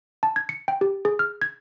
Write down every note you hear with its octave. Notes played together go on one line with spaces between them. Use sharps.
A5
G#6
C#7
G5
G4
G#4
F6
G#6